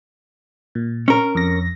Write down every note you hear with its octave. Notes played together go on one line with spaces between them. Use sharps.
A#2
C#4 A#4
F2 A#6